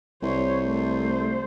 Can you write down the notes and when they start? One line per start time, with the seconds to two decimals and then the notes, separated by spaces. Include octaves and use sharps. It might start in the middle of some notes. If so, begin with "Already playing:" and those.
0.23 C2 C5 C#5
0.66 A3 C5